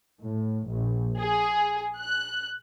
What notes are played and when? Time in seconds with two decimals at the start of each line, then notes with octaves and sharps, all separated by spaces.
0.22 A2
0.69 A#1
1.19 G#4
1.98 F#6